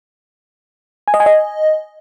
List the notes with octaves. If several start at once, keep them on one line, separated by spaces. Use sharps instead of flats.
G#5
D#5
G#5
D#5